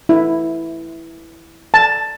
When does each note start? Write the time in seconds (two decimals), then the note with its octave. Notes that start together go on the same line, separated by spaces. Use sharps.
0.09 E4
1.74 A5